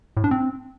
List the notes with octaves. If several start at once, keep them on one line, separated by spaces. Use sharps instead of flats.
A2
D4
C4